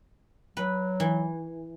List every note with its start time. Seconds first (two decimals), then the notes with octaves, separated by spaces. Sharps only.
0.57 F#3 B4
1.00 E3